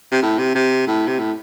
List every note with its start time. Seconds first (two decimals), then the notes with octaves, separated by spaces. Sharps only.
0.11 C3
0.23 A2
0.39 C3
0.55 C3
0.87 A2
1.07 C3
1.19 A2